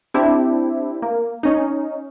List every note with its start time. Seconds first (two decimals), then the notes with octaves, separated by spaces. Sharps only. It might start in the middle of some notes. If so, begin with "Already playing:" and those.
0.14 C4 D4 E4 G4
1.02 A#3
1.43 C#4 D#4